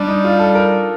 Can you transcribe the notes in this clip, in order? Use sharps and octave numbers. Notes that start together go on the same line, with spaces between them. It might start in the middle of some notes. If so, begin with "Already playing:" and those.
Already playing: G3 D4
D#4
F4
A4
A#4